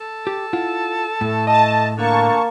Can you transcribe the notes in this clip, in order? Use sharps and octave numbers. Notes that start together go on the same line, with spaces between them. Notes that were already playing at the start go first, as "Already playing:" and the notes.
A4
G4
E4 F4 F#5
A2 A3
D#5 A5
D3 A#3 A5 C#6